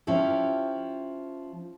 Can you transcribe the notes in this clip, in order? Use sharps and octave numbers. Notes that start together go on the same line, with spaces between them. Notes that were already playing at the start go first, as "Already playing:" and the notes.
F3 C#4 E4 G4